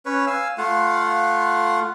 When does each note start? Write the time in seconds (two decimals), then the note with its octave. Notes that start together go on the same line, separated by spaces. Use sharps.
0.06 C#4 B4 C#5
0.27 F5 G#5 E6
0.58 A3 F4 F5 F#5